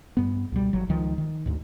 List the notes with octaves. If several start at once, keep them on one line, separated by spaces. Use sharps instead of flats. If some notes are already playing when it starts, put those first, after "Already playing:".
G2 B3
C#2 B2 G3
G#1 F#3
C#2 D#3 F3
D#3
D2 G#2